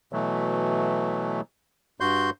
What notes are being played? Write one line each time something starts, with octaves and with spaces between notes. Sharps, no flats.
B2 E3 F#3 A3
G2 F#4 C6 G6